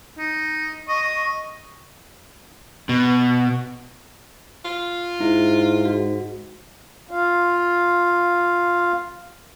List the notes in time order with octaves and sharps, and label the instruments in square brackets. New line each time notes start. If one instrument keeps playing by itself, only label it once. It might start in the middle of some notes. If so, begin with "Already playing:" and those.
[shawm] D#4
[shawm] D#5 [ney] C#6
[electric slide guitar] B2
[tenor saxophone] F4
[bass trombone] G#2 [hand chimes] E4
[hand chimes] F#4
[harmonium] F4 F5